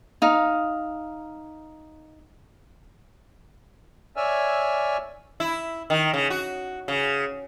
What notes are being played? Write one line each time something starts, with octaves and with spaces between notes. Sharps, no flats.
D#4 F5
C#5 D5 E5 G#5 E6 F6
E4
D#3
C#3
F#4
C#3